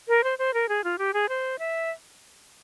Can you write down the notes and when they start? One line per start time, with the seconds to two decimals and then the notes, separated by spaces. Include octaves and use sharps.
0.08 A#4
0.24 C5
0.39 C5
0.54 A#4
0.69 G#4
0.84 F4
0.98 G4
1.14 G#4
1.29 C5
1.59 E5